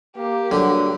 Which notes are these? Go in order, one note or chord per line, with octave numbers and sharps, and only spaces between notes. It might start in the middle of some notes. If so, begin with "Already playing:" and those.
A#3 G4 A#4
G2 D3 F#3